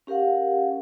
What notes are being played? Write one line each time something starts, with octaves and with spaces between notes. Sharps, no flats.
C#4 G4 A#4 F5 F#5